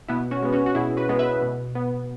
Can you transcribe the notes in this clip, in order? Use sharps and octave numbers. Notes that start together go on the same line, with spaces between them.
B2 B3 E4
C#4 F#4
G#3 B3
C#4 F#4
F#4
B2 E4 G#4
F#4 B4
G#3 B3
B4 E5
B2
B3